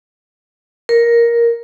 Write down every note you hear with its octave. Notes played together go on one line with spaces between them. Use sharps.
A#4